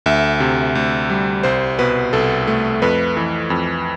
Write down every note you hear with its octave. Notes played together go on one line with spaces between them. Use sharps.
D2 E5
C3
D2
G3
C2 C5
B2 B4
C2 A4
A3
F2 B4
E3
F2